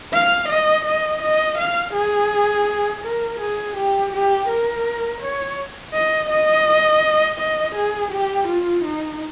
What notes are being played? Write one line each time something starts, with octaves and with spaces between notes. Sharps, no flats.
F5
D#5
D#5
D#5
F5
G#4
A#4
G#4
G4
G4
A#4
C#5
D#5
D#5
D#5
G#4
G4
F4
D#4